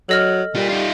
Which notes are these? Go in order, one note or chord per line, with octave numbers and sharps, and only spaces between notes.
F#3 A4 D#5 F6
G3 F4 A#4
D#4 F4